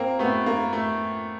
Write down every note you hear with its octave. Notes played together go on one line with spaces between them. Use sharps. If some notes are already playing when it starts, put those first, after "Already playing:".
Already playing: A#3 C4
A3 B3
A#3
A3